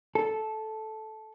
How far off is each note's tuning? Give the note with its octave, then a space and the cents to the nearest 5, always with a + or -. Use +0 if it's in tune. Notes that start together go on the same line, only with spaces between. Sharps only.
A4 -10